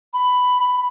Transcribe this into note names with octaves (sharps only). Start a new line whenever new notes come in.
B5